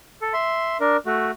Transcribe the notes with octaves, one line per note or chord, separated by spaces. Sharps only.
A4
E5 C6
D4 A#4
A3 F#4